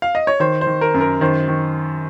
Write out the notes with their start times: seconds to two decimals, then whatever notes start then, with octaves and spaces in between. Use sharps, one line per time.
0.02 F5
0.15 D#5
0.27 C#5
0.40 D#3 C5
0.61 C5
0.67 D#3
0.81 A#4
0.94 F#2
1.01 A#4
1.21 D#3 C5
1.48 D#3